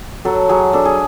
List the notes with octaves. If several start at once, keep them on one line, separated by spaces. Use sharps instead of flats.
F#3 A4
F#3 G#4
D4 A4
G#4